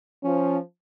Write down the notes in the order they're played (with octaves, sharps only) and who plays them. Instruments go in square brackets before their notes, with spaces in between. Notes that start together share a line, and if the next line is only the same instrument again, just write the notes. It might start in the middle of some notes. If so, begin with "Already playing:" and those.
[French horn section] F3 [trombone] C#4